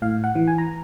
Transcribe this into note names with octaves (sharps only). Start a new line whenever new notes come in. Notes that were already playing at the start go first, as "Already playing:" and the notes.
A2 F5
F#5
E3
G#5
A#5